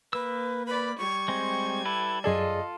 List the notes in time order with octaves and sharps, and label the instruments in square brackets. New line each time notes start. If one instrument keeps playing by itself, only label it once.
[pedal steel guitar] A#3 E6 [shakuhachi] B4
[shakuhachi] B4 [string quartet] D5 B5
[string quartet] G3 G#6 [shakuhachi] C#6
[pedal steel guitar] G#3 C4
E4 A4 B4
[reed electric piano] F#2 G#4 D5 [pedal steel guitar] F4 A4 [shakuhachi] D#5